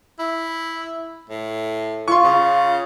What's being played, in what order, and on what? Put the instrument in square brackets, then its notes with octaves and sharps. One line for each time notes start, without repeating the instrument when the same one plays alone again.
[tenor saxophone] E4
A2
[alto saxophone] F4 [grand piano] C6 C#6
[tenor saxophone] C#3